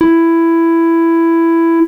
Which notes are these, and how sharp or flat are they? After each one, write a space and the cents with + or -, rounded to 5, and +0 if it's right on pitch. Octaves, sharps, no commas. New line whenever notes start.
E4 +10